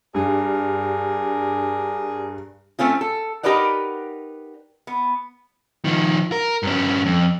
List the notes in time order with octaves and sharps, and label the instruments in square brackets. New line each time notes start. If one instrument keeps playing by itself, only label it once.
[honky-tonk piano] G2 [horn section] D4 G#4 A#4
[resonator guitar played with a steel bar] A3 C4 C#4 F4
A4
D#4 G4 A#4 B4 D5 F#5
B3
[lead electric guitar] D#3 F3
A#4
G2 C#4
F2